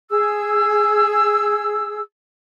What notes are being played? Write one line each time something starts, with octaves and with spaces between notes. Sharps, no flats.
G#4 E6